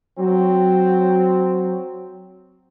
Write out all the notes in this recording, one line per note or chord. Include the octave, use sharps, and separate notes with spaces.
F#3 C4